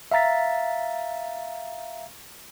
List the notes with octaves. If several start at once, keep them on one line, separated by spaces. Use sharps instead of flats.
E5 F5 A#5 A6 B6